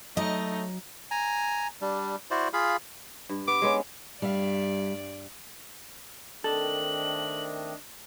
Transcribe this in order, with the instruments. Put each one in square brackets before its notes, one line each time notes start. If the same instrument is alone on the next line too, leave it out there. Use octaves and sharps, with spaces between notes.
[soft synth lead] F#3 [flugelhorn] A3 [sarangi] D#4 [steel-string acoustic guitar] D#5
[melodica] G#5 A#5
G3 D4
E4 F#4 C5 D5
F4 G#4 F5 B5
[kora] G2
[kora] B3 [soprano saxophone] D6
[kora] G#3 B3 C#4
[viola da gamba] G2 D5 [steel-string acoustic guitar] G3 E5 F5
[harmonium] D#3 A3 C4 [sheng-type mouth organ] D4 D#5 [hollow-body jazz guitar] A4 [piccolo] F#7